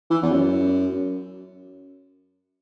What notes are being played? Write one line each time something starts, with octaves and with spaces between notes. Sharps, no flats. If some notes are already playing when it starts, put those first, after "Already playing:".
E3
E2
F#2